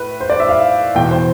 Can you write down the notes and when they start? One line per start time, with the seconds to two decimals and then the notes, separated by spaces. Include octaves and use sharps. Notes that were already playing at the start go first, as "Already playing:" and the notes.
Already playing: A2 B4
0.21 C5
0.30 D5
0.40 E5
0.49 F5
0.95 E2 B2 G5
1.11 C5